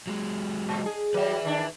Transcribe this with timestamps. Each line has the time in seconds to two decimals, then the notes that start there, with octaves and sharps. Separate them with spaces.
0.07 F#3 G#3
0.69 A#2
0.86 G#4
1.14 F#3 G3 B4 E5
1.45 D#3 D4